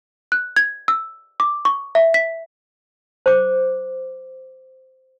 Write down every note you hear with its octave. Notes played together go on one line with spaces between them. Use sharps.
F#6
G#6
E6
D6
C#6
E5
B6
C5 D6